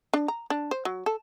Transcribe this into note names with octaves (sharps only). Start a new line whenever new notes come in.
D4
A#5
D4
C5
F#3
A4